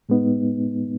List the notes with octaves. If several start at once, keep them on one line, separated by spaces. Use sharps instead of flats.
A2 G#3 B3 D#4